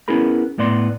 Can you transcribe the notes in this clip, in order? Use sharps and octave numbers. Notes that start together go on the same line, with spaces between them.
B3 C#4 E4 G#4 A#4 B5
A2 B3 D5 C6